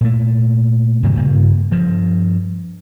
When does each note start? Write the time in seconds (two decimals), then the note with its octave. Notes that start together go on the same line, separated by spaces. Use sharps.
0.01 A#2 A3
1.03 G2 C3 D#3 F#3
1.16 G2 C#3 A#3
1.71 G2 F3